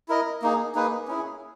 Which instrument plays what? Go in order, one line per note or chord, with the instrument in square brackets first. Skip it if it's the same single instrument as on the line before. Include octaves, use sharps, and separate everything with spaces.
[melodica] E4 A#4 D#5
A#3 D#4 G#4
A#3 D#4 G#4 B4
C#4 E4 G#4